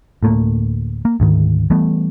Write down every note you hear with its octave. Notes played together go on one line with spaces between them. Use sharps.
D2 A2 A3 A#3
A#3
D2 G#2 D#3
E3 G3 A3 B3